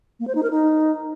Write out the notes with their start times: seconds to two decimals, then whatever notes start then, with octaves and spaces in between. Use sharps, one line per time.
0.20 A#3
0.27 C5
0.35 D#4
0.43 A#4
0.51 D#4